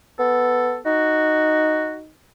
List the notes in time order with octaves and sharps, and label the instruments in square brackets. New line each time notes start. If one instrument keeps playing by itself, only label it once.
[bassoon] B3 [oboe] A4
[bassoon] D#4 [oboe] F#4